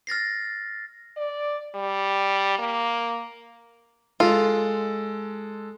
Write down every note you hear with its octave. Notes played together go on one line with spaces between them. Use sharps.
F6 A6 A#6 C7
D5
G3
A#3
G#3 F4 A4